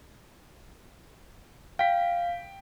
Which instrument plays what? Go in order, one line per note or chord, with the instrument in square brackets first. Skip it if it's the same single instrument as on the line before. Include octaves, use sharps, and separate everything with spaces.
[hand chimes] F5 [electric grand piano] G5 B6